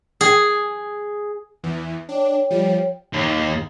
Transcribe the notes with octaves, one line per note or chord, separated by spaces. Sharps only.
G#4
E2 E3
D4 C#5 G5
F3 G3
D#2